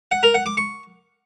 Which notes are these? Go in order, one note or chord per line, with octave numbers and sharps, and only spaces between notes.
F#5
A#4
F#5
D6
C#6